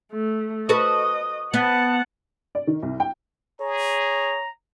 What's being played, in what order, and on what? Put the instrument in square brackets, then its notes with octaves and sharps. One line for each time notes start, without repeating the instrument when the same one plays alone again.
[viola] A3
[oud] F#4 A4 B4 [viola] D#5
[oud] B3 [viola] F#5 A5
[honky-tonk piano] D5
D#3
C2
G5
[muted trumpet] G#4 [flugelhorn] C#5 [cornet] A#5